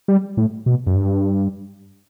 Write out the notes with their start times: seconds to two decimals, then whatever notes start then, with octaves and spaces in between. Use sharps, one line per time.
0.08 G3
0.37 A2
0.66 B2
0.87 F#2
0.96 G2